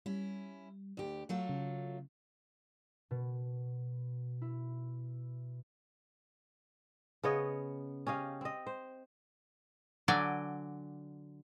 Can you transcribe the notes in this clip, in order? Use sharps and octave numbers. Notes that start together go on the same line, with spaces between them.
G3 C#4 E4
D2 G4
F#3 A3 F4
C#3
B2
E4
C#3 B3 C#5 D#5
C#4 G4 D#5 F5
C4 D#5
C5
D3 F#3 D5 G5 G#5